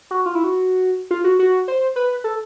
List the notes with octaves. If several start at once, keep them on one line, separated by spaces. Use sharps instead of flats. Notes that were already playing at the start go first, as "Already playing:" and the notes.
F#4
F4
E4
F#4
F4
F#4
F#4
C5
B4
A4